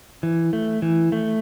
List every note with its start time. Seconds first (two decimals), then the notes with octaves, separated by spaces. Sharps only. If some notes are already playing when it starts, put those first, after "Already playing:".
0.23 E3
0.53 A3
0.82 E3
1.12 A3